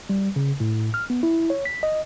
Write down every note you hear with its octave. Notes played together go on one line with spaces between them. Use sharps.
G3
C#3
A2
F6
B3
E4
C#5
B6
D#5